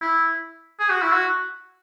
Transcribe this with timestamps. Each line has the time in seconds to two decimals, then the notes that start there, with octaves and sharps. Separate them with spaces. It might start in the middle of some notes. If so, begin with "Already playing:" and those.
0.01 E4
0.79 G#4
0.90 F#4
1.02 E4
1.13 F#4